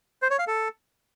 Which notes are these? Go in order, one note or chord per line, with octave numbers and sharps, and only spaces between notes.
C5
C#5
F5
A4